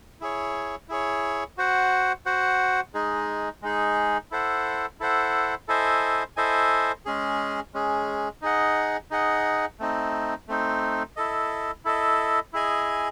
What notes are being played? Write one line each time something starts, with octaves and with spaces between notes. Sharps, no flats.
E4 G#4 C#5
E4 G#4 C#5
F#4 C5 F#5
F#4 C5 F#5
G#3 D#4 G#4
G#3 D#4 G#4
E4 A4 C5 F#5
E4 A4 C5 F#5
E4 A4 C5 D#5 G#5
E4 A4 C5 D#5 G#5
G#3 C#4 G#4
G#3 C#4 G#4
D#4 G#4 D#5 F#5
D#4 G#4 D#5 F#5
A3 C4 D#4
A3 C4 D#4
E4 A4 D#5
E4 A4 D#5
E4 G#4 D#5 G#5